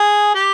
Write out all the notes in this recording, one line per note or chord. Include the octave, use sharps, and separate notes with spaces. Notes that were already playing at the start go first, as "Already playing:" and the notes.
Already playing: G#4
G4